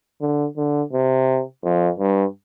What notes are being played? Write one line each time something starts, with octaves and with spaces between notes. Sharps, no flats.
D3
D3
C3
F2
G2